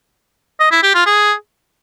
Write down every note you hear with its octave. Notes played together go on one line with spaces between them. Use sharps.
D#5
E4
G4
F4
G#4